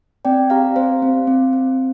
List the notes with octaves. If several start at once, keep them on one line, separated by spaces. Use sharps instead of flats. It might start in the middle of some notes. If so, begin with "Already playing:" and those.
C4 D5 G5
G4 F5 A#5
C4 C5 F5
C4
C4
C4